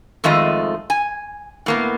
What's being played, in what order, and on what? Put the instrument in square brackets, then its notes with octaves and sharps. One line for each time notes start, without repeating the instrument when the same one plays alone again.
[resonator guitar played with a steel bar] F2 D#3 G#3 A3 F4 D#5
G#5
A2 A#3 B3